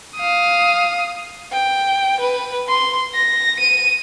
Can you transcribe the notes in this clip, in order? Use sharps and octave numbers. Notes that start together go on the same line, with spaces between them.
F5 D#6
G5
B4
C6
A#6
D#7